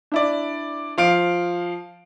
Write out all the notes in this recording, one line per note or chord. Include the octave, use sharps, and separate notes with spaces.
D4 E4 D5
F3 F5 D7